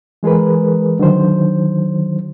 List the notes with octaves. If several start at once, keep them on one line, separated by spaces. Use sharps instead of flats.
E3 G#3 G#4 A#4 B4
D3 D#3 F#3 C5